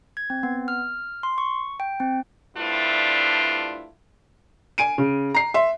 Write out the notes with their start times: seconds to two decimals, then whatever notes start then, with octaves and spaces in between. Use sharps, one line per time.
0.17 G#6
0.30 C4
0.43 B3
0.68 F6
1.23 C6
1.38 C#6
1.80 G5
2.00 C4
2.56 G2 C3 A3 D4 E4 F4
4.78 G#5 D7 D#7
4.98 C#3
5.35 A#5 C7
5.54 E5 C6